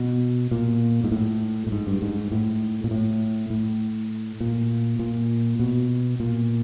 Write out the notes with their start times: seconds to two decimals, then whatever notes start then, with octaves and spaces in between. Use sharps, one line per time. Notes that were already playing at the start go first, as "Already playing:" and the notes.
Already playing: B2
0.51 A#2
1.04 G#2
1.12 A2
1.67 A2
1.72 G#2
1.87 G2
2.02 G#2
2.32 A2
2.84 A#2
2.91 A2
3.50 A2
4.41 A#2
4.99 A#2
5.60 B2
6.20 A#2